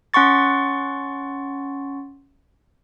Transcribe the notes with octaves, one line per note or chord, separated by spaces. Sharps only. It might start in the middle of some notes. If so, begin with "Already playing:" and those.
C#4 F#5 C6 C#6 A6